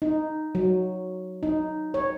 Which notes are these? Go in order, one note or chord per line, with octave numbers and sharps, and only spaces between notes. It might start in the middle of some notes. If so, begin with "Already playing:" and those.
D#4
F#3
D#4
C#5